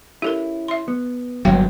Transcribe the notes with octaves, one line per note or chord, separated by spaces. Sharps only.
C#4 E4 G4 A4 A#4
E5 C6
B3
G1 D#2 F#3 C#4 F5 G5